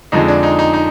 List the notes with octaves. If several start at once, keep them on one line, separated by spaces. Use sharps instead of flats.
F2 D3 F3 G#3 D#4
D4
D#4
D#4
D#4